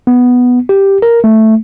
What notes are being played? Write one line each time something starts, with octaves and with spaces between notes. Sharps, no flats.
B3
G4
A#4
A3